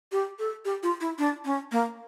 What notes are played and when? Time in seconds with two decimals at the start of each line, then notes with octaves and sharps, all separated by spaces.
0.12 G4
0.39 A4
0.65 G4
0.83 F4
1.01 E4
1.18 D4
1.45 C#4
1.72 A#3